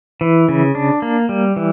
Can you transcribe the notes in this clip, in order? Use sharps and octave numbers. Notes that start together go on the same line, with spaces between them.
E3
C#3
D4
A#3
G3
E3